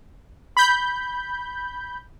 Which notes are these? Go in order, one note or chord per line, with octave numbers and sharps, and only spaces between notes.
B5 G6